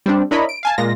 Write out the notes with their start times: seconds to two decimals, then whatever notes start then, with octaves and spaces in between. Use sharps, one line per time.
0.06 G3 C4 D4
0.31 D4 E4 A#4 C#5 D#5 B5
0.49 D7
0.63 F5 G#5 A5
0.78 A#2 G#3 F4 A#6